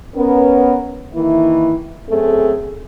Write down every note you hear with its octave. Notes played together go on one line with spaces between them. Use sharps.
B3 C#4 A#4
D#3 E3 A#3 E4
F#2 A3 C4 G#4 A4